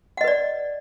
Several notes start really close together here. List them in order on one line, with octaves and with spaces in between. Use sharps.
F#5 D#5 B4 D5